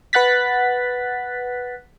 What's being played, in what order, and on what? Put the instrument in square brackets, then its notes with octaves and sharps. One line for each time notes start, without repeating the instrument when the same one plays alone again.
[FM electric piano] B4 F#5 F#6 A6 B6